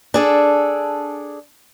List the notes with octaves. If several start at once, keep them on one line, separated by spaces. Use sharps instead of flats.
D4 G#4 A4